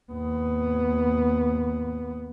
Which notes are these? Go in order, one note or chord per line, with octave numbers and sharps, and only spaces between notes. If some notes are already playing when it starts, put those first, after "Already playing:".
D#2 B3